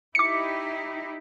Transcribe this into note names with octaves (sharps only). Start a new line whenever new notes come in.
D#4 E4 G4 D6 C#7